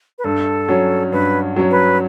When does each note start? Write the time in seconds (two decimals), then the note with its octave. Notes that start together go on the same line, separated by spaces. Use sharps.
0.18 B4
0.24 G2 A4
0.68 F#3 C#4
1.12 G2 B4
1.56 F#3 C#4
1.71 B4